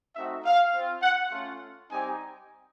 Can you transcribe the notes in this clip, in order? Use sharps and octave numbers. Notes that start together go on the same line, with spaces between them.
A3 C4 D#4 F#4 E5
F5
C4 F4
F#5
A3 C#4 F4
G3 C4 D#4 G4 G#5